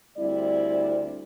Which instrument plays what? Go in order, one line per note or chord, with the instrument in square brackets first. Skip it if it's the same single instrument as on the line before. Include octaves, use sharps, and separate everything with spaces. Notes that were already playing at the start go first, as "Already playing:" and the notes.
[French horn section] D2 G3 C4 E4 D5